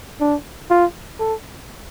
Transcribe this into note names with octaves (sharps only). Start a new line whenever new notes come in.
D4
F4
A4